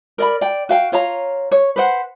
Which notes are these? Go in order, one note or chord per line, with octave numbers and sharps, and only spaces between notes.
A#4 D5 B5
D5 G5
F#4 F5 G5
F4 C#5 F5 A#5
C#5
B4 C5 F#5